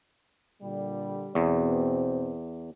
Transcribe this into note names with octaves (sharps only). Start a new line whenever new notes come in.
A#2 D3 G3
E2 B2 C4